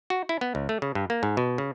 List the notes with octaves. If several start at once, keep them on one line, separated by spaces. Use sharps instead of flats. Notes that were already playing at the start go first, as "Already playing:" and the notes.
F#4
E4
B3
C#2
A3
C#3
G2
A#3
G#2
B2
C#3